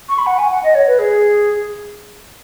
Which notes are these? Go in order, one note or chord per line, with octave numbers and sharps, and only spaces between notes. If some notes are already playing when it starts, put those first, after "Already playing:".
C#6
B5
F#5
G#5
F#5
D#5
C#5
B4
G#4